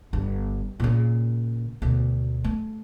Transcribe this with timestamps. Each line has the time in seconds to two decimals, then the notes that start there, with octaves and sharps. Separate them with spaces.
0.13 G1 G2
0.80 A#2 C#3
1.82 D2 B2
2.44 A3